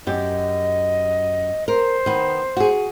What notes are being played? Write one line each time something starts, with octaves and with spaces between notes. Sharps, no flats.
F#2 G4 D#5
A#4 C5
D#3 B3
F#4 G#4